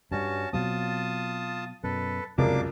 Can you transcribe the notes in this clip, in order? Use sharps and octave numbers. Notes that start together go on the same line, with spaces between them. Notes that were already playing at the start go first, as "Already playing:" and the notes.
G2 G3 C#4 F#4 A5
B2 F#3 C4 F4 A5 D#6
F#2 B2 A4 B4
F1 C#2 F#2 C3 G#3 A#3 D4 D6